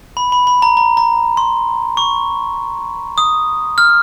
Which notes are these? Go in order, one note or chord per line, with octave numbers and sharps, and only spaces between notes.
B5
B5
B5
A#5
A#5
A#5
C6
C#6
D#6
F6